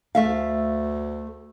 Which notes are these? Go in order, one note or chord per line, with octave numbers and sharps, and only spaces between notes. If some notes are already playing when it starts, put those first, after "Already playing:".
D2 A3 E5 F5